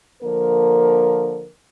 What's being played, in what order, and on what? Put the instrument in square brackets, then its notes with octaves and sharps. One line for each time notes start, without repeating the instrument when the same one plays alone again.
[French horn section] D3 F3 A#3 A#4